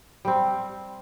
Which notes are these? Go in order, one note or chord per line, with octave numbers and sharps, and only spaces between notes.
G3 C4